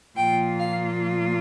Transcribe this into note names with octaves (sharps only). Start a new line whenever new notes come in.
A#2 F3 A#3 F4 G5
F5